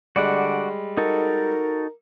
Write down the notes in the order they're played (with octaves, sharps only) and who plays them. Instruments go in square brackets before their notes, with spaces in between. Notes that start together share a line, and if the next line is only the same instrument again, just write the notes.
[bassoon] D3 [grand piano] G3 G#3 [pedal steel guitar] F#4 D5 F#5
[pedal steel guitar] D#4 F#4 A4 [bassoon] A#4